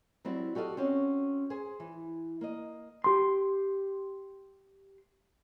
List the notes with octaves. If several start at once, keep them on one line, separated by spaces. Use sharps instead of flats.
F#3 G3 C4 E4
F#4 G4 A4 D#5 F5
C4 C#4 F#4
G#4 C5 G#5
E3
A#3 D#5
G4 C6